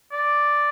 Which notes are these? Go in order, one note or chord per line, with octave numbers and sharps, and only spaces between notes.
D5